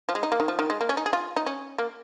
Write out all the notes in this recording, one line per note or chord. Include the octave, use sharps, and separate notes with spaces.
F3
G#3
D#4
A#3
D#3
F3
D#3
G#3
A#3
C#4
D#4
G#4
F4
D#4
C#4
A#3